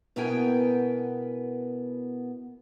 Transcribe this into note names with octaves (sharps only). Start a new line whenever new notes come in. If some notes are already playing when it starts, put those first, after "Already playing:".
B2 B3 E4 A#4 G5 G#5